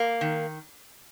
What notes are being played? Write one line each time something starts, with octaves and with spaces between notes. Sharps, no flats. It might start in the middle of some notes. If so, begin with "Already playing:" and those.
Already playing: A#3
D#3